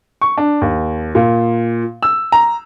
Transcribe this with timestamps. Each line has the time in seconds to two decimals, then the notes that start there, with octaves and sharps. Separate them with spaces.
0.22 C#6
0.38 D4
0.61 D#2
1.15 A#2
2.03 E6
2.32 A#5